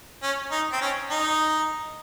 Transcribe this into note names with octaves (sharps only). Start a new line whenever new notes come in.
C#4
D#4
C4
C#4
D#4